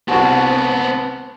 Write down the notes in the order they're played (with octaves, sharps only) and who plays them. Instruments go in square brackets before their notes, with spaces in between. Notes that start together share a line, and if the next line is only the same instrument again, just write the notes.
[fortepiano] C2 F#4 [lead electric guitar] B3 C4 [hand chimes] F#5 G#5 A5